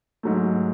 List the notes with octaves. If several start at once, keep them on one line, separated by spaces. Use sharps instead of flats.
G#2 F#3 A3